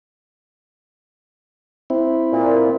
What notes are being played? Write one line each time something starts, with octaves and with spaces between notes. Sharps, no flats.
C4 E4
A#2